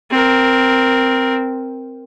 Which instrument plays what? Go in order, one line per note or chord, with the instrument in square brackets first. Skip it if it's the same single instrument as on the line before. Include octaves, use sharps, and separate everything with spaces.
[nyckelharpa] C4 A#4